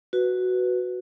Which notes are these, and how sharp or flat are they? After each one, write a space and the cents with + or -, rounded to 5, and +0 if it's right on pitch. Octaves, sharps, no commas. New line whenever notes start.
F#4 +0 B4 +0